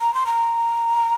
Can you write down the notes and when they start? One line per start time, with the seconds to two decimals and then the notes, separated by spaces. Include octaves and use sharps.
0.01 A#5
0.14 C6
0.26 A#5